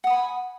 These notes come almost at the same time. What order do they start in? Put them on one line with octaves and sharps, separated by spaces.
F#5 D#6 B5 G#5